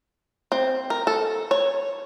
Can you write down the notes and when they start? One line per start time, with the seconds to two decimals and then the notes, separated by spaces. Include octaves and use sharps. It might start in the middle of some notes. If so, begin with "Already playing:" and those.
0.52 C4
0.90 A#4
1.07 A4
1.51 C#5